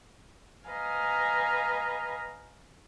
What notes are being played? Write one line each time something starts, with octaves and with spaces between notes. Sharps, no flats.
B4 D#5 F5 G#5 A#5